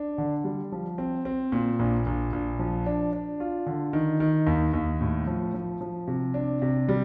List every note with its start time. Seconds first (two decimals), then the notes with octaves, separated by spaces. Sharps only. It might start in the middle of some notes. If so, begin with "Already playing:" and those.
Already playing: D4
0.18 D3
0.44 G3
0.72 F3
0.98 C4
1.25 C4
1.52 A#2
1.79 A#1
2.06 A#1
2.33 A#1
2.59 F3
2.86 D4
3.13 D4
3.40 F4
3.66 D3
3.93 D#3
4.20 D#3
4.47 D#2
4.73 D#2
5.01 A2
5.27 F3
5.54 F3
5.81 F3
6.07 C3
6.34 D4
6.62 C3
6.89 G3